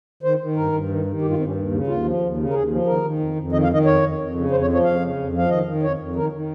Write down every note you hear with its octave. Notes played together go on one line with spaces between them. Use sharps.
D#3 C5
D#3
G2 A#4
G2
D#3
D#3
G2 G4
F4
G2 C4
C#4
D#2
C#3
D#2 F4
F3
D#2
C#3
A#4
D#2 G#4
F3
D#3 A#4
D#3
F2
F2
D#3 D#5
F5
D#3
D#5
F2 C#5
F2
F2
C#3
F2 C5
C#5
F3
C#5
F2 F5
C#3
F2
F3
F5
D#3 D#5
D#3
F2 C#5
F2
D#3 A#4
D#3